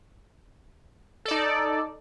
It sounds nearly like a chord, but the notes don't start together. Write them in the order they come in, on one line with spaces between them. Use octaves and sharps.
A4 D5 D#4